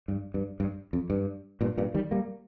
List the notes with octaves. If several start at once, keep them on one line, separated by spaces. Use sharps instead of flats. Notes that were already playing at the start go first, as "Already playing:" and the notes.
G2
G2
G2
F2
G2
G2 A#2
G2 A#2
D#3 G3
G3 A#3